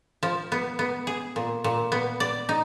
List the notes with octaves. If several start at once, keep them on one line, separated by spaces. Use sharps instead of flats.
F3
B3
B3
G#4
A#2
A#2
B3
D5
D#4